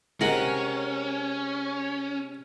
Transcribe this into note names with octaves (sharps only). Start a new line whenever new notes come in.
C3 G#3 C#4 A#4 F#5